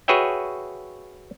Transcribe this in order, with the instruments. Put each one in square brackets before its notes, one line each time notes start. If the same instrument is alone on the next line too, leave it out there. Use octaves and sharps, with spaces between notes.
[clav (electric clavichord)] F#4 G#4 B4 C#5 E5 G5